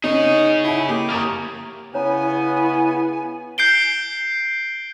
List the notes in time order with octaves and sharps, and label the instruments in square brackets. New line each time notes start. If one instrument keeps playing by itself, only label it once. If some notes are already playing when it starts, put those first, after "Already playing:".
[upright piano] C#4 [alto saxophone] D#4 [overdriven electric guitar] G#4 C#5
[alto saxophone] E4 [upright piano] F#5 G#5
[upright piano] A#3 [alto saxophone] G4
[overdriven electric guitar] A#3 C#5 [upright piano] A#5 D#6 A6
[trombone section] C#3 B3 [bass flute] E4 [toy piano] C#5 A#5 [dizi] G#5
[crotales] G6 C7 D7 G7